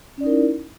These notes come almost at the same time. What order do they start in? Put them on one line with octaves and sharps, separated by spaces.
C#4 D5 D#4 A#4 E4